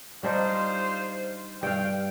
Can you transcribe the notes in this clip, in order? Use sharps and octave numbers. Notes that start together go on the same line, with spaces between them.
G3 D4 D#4 F4 C5
G2 F5 G5